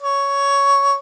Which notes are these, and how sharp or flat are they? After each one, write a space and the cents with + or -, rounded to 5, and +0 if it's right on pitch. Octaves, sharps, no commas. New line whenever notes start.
C#5 +10